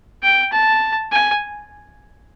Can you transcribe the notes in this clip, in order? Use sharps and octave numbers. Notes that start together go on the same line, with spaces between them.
G5
A5
G#5